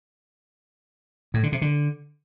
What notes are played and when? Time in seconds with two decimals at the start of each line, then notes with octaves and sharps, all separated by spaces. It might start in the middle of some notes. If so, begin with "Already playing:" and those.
1.34 A2
1.43 D3
1.52 C3
1.62 D3